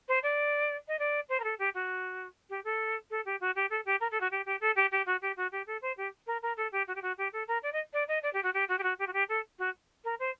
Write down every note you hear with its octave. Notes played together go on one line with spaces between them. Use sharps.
C5
D5
D#5
D5
C5
A#4
A4
G4
F#4
G4
A4
A4
G4
F#4
G4
A4
G4
A#4
A4
F#4
G4
G4
A4
G4
G4
F#4
G4
F#4
G4
A4
C5
G4
A#4
A#4
A4
G4
F#4
G4
F#4
G4
A4
A#4
D5
D#5
D5
D#5
D5
G4
F#4
G4
F#4
G4
F#4
G4
F#4
G4
A4
F#4
A#4
C5